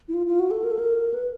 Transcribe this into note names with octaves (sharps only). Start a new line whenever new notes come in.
E4
F4
F4
F#4
A4
A#4
A4
A#4
B4